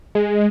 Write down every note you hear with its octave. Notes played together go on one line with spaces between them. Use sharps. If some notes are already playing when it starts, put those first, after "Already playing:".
G#3